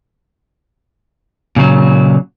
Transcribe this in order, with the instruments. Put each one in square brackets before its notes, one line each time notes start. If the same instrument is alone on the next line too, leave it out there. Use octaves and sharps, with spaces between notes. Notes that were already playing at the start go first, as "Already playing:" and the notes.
[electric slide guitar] A#2 C#3 F#3